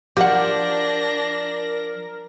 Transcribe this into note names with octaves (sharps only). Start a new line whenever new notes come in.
F3 D4 G4 A#4 F#5 A#6